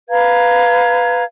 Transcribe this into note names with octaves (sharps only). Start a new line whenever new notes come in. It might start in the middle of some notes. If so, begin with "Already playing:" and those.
B4 F5 A#5 G#6